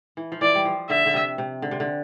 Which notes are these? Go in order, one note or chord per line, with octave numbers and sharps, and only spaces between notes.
E3
F3
E3 D5
G3
F3
D3 E5
D3
C3
C3
D3
C3
D3